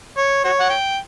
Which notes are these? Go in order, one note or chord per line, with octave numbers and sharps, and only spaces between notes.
C#5
F#4 C#5
F#5
G5